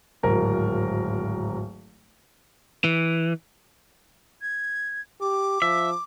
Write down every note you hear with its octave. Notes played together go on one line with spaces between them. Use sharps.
D1 G#1 A#4
E3
G#6
G4 D6
F3 E5